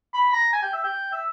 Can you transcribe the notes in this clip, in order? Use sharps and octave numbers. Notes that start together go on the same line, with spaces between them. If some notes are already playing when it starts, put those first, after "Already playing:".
B5
A#5
G#5
G5
E5
G5
E5